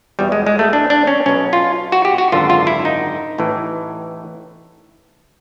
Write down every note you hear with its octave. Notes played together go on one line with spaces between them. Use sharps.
E2 B2 G3
G#3
G#3
A3
D4
D4
C#4
B1 B2 C#4
F4
F#4
G4
F#4
G#1 F#2 D3 F4
F4
E4
D#4
A1 A2 E3